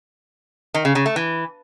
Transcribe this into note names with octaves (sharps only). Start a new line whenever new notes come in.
D#3
C#3
C#3
A3
E3